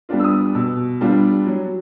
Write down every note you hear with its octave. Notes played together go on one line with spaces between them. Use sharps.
G3 B3 D4 F4
E6
D#6
B2 E6
G3 B3 D4 F4
F#3